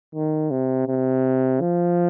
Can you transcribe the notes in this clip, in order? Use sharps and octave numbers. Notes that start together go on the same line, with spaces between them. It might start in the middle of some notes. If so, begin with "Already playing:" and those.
D#3
C3
C3
F3